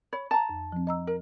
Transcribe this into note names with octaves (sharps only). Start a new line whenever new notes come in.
C#5 B5
A5 A#5
F2
F3 C4
D#5 A#5 E6
A#4